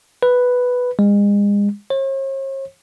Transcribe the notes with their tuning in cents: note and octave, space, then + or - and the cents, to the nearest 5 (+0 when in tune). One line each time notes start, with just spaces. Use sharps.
B4 +0
G#3 -35
C#5 -45